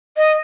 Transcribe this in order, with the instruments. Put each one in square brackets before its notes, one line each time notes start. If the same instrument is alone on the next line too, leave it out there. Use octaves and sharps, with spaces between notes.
[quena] D#5